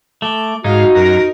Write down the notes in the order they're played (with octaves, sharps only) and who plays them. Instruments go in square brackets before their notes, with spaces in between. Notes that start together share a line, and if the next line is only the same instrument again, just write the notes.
[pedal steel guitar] A3 [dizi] D6
[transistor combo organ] G#2 [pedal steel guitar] D#4 [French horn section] F#4 [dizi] F5
[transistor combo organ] F#2 A#5 [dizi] A#4